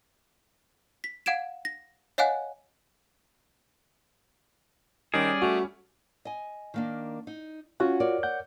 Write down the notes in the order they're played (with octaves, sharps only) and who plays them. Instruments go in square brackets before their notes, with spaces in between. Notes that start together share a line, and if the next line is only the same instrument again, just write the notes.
[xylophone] B6
F5 F#5 G#6 D7 E7
A#6
C#5 D#5 F5 F#5 G#5 F#6
[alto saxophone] D#3 [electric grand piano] G3 C#4 [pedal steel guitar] G#4 D5
[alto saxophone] A3 [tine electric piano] F#4
[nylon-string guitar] D#5 G#5
D#3 A#3 D4
D#4
[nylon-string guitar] C#4 [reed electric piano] F4 F#4 F#5
[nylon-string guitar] A#4 C#5 D5
[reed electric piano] F#5 G6